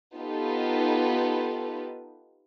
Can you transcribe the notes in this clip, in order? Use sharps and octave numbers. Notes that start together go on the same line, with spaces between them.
B3 D#4 F4 G4 A4 B4